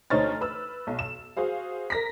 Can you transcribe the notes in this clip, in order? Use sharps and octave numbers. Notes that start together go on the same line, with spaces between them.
D2 D#4 C5 C#5 F6 A6
B4 E6
B1
E7
F#4 G#4 C5 F5
A#4 A#6 B6